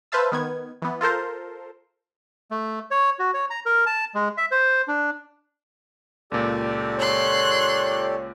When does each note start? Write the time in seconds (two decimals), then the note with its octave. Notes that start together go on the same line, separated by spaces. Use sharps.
0.12 B4 C5 E5 F5 A5 E6
0.32 D#3 B3 G#6
0.82 E3 B3
1.01 F4 A4 A#4 C5
2.51 A3
2.91 C#5
3.19 F#4
3.34 C#5
3.50 A#5
3.66 A#4
3.86 A5
4.15 G#3
4.37 E5
4.51 C5
4.88 D4
6.32 C#2 A#2 G4 A4 D5
6.99 C#5 C6 F#6